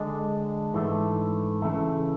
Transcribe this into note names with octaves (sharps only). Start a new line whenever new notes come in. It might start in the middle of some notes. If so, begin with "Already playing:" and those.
Already playing: D3 G#3 D4
G#2 E3 A3 D4
C#3 E3 A3